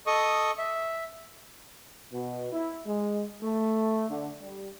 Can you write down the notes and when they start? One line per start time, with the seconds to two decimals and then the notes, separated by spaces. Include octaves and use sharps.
0.07 A4 D#5 C#6 D#6
0.58 E5
2.12 B2
2.53 E4
2.86 G#3
3.42 A3
4.10 D3
4.39 G3